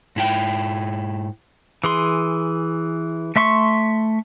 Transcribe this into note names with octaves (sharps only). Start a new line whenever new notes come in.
G#2 E4 G5
E3 G#4 C6
A3 E5 C6 C#6